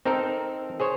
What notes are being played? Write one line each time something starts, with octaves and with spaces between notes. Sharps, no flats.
C4 D#4 A4 A#4
G#4 C5 C#5